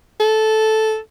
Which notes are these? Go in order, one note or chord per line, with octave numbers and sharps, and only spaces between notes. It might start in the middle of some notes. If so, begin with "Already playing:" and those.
A4